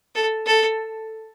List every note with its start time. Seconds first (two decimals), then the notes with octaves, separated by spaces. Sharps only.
0.15 A4
0.46 A4